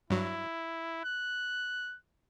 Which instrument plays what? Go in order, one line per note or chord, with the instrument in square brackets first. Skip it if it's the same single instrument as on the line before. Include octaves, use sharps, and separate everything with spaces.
[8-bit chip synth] G2 F#3 [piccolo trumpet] E4
[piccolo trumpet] F#6